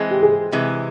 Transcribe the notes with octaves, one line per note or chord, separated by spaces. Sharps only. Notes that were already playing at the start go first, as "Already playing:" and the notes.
Already playing: E3 G#3 C4
G4
G#4
C3 E3 G#3